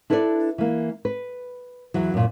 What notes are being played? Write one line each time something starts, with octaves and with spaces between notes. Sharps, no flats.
D4 E4 A4 B4 C5 D5
E3 A#3
B4
E2 E3 F#3
F#2 A#2